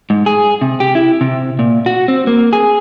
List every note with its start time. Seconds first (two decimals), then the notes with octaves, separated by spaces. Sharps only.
0.10 G#2
0.26 G#4
0.61 C3
0.80 G4
0.95 E4
1.21 C3
1.59 A#2
1.86 F#4
2.08 C4
2.27 A#3
2.53 G#4